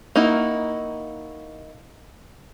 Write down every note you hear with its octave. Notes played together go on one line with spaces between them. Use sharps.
A#3 D#4 E4 F#4